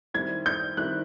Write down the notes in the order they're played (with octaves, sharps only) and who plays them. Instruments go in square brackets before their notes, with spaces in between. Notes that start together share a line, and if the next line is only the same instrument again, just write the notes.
[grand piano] D#3 G3 C4 E4 [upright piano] G#6
[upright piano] G6
[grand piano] D#3 G3 C4 E4 [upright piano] F#6